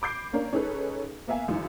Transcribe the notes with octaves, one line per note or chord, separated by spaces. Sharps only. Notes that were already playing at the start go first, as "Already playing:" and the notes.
B5 D6 G6 C7
A#3 C#4 D4 A#4
C#4 D#4 G#4 A4 B4
A#3 B3 E5 F5 G#5
C#2 F#2 D#3 E3